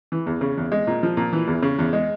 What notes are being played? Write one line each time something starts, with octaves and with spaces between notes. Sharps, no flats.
E3
E2
C#3
E2
G#3
A#2
F3
A#2
E3
E2
C#3
E2
G#3